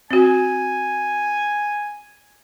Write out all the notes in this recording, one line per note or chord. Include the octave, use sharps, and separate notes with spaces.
C4 F#4 G#5